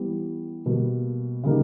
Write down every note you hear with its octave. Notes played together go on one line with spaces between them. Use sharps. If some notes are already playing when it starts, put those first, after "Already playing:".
Already playing: E3 G3 B3
B2 G3 A#3
C#3 G3 A#3 D#4